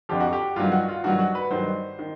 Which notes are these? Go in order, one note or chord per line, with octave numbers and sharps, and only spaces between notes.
F2 D3 F3 G4
F#4
G4
G2 D#3 F#3 F4
F#4
F4
G2 D#3 F#3 F#4
F#4
B4
G2 D#3 F#3 C5
D#3